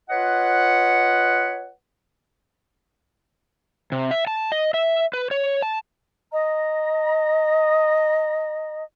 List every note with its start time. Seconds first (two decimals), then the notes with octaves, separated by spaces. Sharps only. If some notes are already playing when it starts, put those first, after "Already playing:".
0.09 F4 B4 C#5 D#5 F#5
3.92 C3
4.11 E5
4.27 A5
4.52 D#5
4.74 E5
5.13 B4
5.31 C#5
5.62 A5
6.31 D#5 A#5